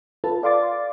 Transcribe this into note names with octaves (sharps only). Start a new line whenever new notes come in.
F4 A4 B4 A5
D5 F5 C6 D6 A6